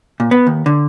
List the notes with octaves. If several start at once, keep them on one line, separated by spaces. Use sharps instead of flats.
A#2
B3
D#2
D3